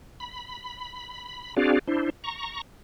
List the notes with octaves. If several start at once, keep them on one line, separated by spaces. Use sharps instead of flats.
B5
C4 D4 F#4 G#4 D5 F5
D4 E4 C5
A#5 C#6